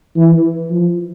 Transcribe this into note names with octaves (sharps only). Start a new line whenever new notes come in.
E3
F3